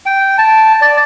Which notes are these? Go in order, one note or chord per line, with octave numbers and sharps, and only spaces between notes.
G5
A5
D5